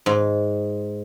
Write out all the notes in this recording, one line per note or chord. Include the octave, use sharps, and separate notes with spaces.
G#2